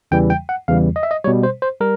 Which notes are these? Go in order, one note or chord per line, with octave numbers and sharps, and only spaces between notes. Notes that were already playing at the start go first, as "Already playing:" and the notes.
E2 C#3 E3 G3 G5
G5
F#5
E2 C#3 E3 G3 F5
D#5
E5
D#5
B2 G3 C#5
C5
C5
G3 A#4